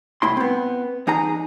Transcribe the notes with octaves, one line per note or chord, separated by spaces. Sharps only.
C2 A2 E4 C6
B3 C4
E2 D#4 G#4 A#5